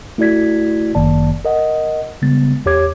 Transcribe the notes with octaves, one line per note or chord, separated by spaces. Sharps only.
A3 E4 F#4 D5 G#6 B6
G1 F#2 D#3 A#3 D5 A5
A#4 D#5 F#5
C#3 G3 G#3 B3 A6
E2 G4 C#5 D6 G#6